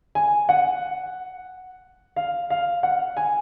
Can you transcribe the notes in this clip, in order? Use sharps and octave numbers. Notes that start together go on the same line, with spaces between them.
G#5
F#5
F5
F5
F#5
G#5